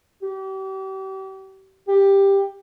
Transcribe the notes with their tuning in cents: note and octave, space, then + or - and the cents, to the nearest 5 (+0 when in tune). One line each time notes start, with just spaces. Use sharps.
G4 -40
G4 +10